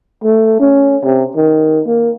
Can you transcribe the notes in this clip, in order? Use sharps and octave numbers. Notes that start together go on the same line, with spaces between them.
A3
C#4
C3
D#3
A#3